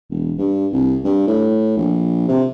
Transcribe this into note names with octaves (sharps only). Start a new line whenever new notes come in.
E1
G2
C2
G2
A2
A#1
C3